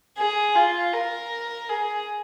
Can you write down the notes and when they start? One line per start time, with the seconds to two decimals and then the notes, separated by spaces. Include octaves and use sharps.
0.18 G#4
0.55 F4
0.93 A#4
1.69 G#4